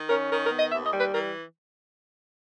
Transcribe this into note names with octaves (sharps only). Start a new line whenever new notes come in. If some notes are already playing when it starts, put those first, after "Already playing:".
Already playing: D#3
C#4 A#4
D#3 A#4
A#4
B3
D#5
D#2 E5
D#5
G3
B4
E3 A#4